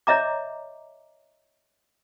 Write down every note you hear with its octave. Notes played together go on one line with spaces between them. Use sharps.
C#5 D#5 E5 A#5 D6